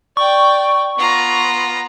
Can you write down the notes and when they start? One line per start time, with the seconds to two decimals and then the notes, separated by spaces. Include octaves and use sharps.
0.17 D5 G5 C#6
0.98 B3 F4 A#5